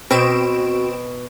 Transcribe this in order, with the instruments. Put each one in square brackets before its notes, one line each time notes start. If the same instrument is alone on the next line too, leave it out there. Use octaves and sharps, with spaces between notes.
[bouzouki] B2 [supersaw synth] C4 D7 E7 [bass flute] F#4